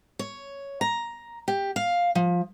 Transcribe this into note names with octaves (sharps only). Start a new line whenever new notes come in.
C#5
A#5
G4
F5
F3